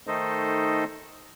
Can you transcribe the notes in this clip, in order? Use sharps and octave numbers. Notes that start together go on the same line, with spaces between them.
D#3 A3 D#4 A4 C5 D#5